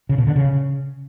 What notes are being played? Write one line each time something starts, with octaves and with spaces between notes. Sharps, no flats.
C#3
B2
D3
C#3